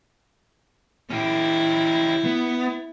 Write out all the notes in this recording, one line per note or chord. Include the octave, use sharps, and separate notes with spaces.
C#4 E4 G4
B3